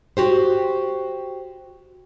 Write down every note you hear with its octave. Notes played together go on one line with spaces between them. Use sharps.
F#4 G4 C5